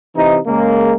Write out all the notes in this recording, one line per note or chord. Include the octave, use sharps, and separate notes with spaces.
C3 E3 D#4
C#3 G#3 A#3